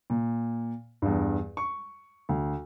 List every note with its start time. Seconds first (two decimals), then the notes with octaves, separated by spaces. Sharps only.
0.10 A#2
1.02 E2 G2
1.57 C#6
2.29 D2